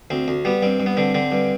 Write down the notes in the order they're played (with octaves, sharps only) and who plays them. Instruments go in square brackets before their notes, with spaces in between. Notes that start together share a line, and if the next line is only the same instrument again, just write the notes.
[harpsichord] D2 C4
D2
G3 B3
G2 C4
G2
B3
D3 C4
D3 C4
G2